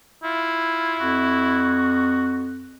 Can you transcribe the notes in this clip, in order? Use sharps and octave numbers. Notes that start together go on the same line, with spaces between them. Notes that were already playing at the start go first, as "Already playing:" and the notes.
E4 F4
F2 F#4